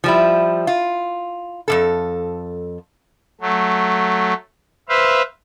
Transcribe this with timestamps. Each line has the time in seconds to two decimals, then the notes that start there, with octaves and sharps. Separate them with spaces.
0.04 F3 G3 E4
0.67 F4
1.68 F2 B2 A4
3.41 F#3 A3
4.89 B4 C5 E5 F5